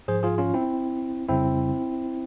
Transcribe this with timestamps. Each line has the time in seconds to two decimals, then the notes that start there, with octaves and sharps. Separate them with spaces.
0.08 G#2 F3 G#4 C5
0.23 F4 G#4
0.38 C#4 F4
0.54 C4 E4
1.29 F2 C#3 G3 C4 E4